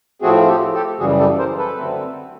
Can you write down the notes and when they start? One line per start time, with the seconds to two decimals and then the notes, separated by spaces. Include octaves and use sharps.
0.22 A2 F3 A3 C4 F#4 G#4
0.48 G4 A4
0.74 G4 A4
1.00 F#2 C#3 E3 G3 F#4 G#4
1.19 G4 A4
1.38 A#4 C5
1.58 A4 B4
1.77 D3 F#3 A3 C4